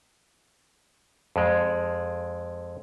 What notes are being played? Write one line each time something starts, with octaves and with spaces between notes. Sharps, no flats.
F2 G#3